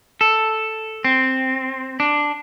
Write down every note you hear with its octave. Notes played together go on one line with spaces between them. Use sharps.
A4
C4
D4